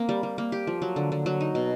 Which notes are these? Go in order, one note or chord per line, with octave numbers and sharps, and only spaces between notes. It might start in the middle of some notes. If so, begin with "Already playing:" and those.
Already playing: A#3 C4
G3
G3
A#3
G4
F3
F#3
D3
D3
F#3
D#4
B2